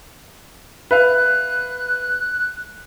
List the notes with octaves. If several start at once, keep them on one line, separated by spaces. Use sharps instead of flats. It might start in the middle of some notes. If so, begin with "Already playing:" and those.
B4 E5 F5 F#6